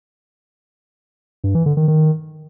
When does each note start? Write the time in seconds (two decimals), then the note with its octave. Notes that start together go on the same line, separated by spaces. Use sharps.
1.44 G2
1.55 E3
1.66 D3
1.77 D#3
1.88 D#3